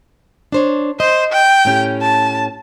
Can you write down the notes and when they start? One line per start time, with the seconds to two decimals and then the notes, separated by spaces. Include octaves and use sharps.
0.52 D4 C5 C#5
1.00 C5 D#5
1.32 G5
1.65 A2 C#4 G4
2.02 A5